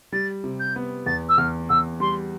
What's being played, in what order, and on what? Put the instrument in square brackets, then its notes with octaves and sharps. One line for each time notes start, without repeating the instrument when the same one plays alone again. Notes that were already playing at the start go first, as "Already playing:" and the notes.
[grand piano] G3 [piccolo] A6
[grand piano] C3
[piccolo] G6
[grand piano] B3
[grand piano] E2 [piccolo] A6
[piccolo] E6
[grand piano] E2 [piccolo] F6
[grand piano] E2 [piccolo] E6
[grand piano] G3 [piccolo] C6